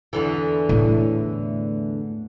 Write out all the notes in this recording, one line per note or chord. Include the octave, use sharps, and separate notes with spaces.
E2 D3 E3
A2 A3